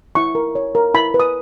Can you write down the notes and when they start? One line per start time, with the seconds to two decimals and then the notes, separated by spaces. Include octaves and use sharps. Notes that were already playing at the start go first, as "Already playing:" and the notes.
0.15 E4 C#6
0.35 A#4
0.55 C#5
0.75 A#4
0.94 E4 B5
1.14 B4
1.20 D#6